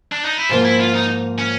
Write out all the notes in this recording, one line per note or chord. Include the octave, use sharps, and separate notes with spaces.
D4
D#4
E4
G#2 F3 A#3 F4
E4
F4
D#4
C#4